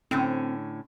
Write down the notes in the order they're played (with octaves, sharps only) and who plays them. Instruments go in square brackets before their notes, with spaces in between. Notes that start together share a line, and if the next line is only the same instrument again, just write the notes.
[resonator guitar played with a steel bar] A2 D3 C#4 [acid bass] C4